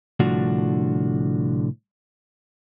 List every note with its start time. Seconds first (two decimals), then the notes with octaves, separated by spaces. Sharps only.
0.20 C2 A2 D3 F3 D4 F#4